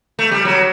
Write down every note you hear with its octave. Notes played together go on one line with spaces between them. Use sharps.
A3
G3
F#3